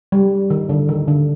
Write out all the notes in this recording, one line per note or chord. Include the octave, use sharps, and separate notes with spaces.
G3
D#3
D3
D#3
D3